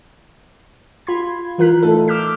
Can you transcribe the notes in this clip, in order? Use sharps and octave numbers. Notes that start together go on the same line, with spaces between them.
F4 B5 C6 G#6
E3 F4 A#4 F#6 B6
A2 A3 D#4 A4
D6 E6 F6 G6 B6